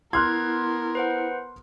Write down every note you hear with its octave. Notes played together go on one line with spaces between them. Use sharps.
B3 E4 A#4 C6 F6 F#6 G#6
B4 C5 F#5